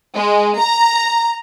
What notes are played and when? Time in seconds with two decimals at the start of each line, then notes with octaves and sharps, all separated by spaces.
0.16 G#3
0.58 A#5